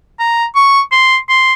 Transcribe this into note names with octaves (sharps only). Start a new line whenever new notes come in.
A#5
C#6
C6
C6